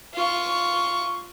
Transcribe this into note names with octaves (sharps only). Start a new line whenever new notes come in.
F4 C#6